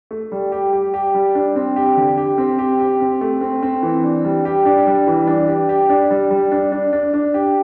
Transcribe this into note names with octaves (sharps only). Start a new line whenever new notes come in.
A3
G3
G4
G4
G4
G3
D4
C4
G4
D3
G4
C4
G4
G4
C4
A3
C4
C4
E3
D4
G3
G4
D4
G3
E3
D4
G4
G4
D4
G3
G3
D4
D4
D4
D4
G4